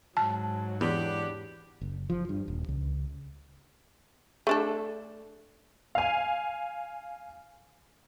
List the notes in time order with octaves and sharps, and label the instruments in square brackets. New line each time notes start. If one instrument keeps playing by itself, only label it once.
[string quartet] G#2 F#3 [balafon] A5
[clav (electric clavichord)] E2 [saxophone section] B3 D4 G4
[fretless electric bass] F#1
F3
G2
D#1
C#2
[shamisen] A3 D4 A4
[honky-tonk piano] F5 G#5